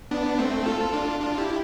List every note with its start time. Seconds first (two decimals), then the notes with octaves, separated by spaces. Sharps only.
0.11 B3 D4
0.39 A3 C4
0.66 F4 A4
0.93 D4 F4
1.20 D4 F4
1.38 E4 G4